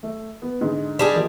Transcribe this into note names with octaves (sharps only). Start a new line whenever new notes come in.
A3
B3
G#2 D3 G#3
G3 D4 G#4
F3 A#3 D#5